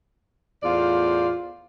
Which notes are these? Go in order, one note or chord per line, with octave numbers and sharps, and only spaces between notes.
E2 A2 F4 C5 D5 F5